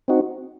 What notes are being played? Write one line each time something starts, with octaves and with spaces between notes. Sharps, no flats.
C4 D#4 F#4